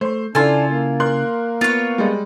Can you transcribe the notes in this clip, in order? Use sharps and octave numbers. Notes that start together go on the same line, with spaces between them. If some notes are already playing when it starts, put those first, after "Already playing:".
A3 C5 C6
C#3 D4 E4 F4 A4 G#5 C6
A#3
A#4 C6 F#6
B3 F4 C#5
G3 G#3